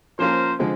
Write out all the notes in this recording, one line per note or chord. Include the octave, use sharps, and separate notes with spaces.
F3 A#3 C#4 F4 A#4 C5
D3 F3 G#3 C4